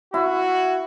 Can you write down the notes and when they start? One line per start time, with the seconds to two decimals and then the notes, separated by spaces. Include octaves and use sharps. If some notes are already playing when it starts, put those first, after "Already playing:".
0.14 E4 F#4